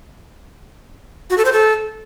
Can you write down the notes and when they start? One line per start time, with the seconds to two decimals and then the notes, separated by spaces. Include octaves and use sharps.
1.30 F#4
1.38 A4
1.45 C5
1.53 A4